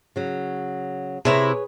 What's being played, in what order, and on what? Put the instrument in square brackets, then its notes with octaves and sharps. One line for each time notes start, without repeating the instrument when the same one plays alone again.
[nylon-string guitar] C#3 F#3
[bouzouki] C3 E4 A#5 [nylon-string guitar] G#4 B4 C#5